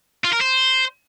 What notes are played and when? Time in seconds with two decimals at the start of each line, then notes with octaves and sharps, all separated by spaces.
0.24 F4
0.32 A#4
0.41 C5